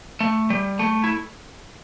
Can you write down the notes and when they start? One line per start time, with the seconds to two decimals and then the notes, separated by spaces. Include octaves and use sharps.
0.20 A3
0.50 G3
0.79 A3
1.04 E4